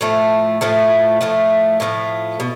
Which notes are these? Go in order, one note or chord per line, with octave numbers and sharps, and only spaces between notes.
A2 F3 A3
A2 F3 A3
A2 F3 A3
A2 F3 A3
B2